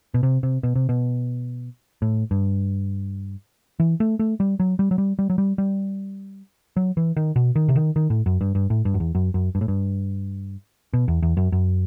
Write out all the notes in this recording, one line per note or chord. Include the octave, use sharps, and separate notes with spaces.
B2
C3
C3
B2
C3
B2
A2
G2
E3
A3
A3
G3
F#3
G3
F#3
G3
G3
F#3
G3
G3
F#3
E3
D#3
B2
D#3
C3
D#3
D#3
A2
F#2
G2
G2
A2
G2
F#2
E2
F#2
F#2
G2
A2
G2
B2
E2
E2
F#2
F#2